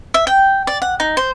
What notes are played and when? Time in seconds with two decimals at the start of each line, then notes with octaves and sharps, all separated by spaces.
0.14 E5
0.27 G5
0.67 D5
0.82 F#5
1.00 D#4
1.17 C5